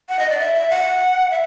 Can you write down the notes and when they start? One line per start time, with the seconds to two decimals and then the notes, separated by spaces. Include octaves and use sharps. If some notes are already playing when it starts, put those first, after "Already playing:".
0.09 F#5
0.19 D#5
0.29 D5
0.39 E5
0.55 E5
0.70 F#5
1.31 E5